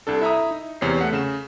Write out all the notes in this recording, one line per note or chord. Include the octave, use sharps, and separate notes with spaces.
C2 D4 A4
E4 E5 A#5 D#6
D#4
E2 C3 C#5 G6 C7
A3 F#5 B6
C#3 E7